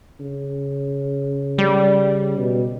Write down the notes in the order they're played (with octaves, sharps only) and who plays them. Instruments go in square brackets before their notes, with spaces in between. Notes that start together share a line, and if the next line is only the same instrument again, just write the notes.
[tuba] C#3
[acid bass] G3
[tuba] B2